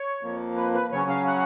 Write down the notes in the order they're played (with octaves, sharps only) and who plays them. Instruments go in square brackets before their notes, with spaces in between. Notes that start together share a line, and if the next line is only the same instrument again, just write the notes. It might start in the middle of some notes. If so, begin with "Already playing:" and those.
Already playing: [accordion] C#5
F2 F3 A#3
B4
B4
C#3 F#3 C#4 C#5
F5
F#5